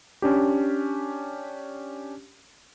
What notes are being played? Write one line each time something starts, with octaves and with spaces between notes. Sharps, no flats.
C#4 D4 G4